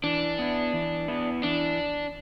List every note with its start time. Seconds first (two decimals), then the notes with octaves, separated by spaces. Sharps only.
0.04 E3 D4
0.39 B3 E4
0.73 E3
1.08 B3 E4
1.43 E3 D4